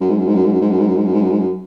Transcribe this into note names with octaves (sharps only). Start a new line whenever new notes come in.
F#2
G#2
F#2
G#2
F#2
G#2
F#2
G#2
F#2
G#2
F#2
G#2
F#2
G#2
F#2
G#2
F#2